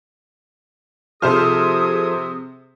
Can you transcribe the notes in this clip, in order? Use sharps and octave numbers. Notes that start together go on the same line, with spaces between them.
C3 F3 G#4 A4 C5 D#6 F6